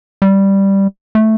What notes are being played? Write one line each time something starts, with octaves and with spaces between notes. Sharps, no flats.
G3
A3